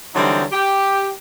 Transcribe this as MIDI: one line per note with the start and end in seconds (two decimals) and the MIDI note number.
0.15 0.44 50
0.15 0.44 52
0.15 0.44 54
0.15 0.44 55
0.15 0.44 60
0.15 0.44 63
0.52 1.12 67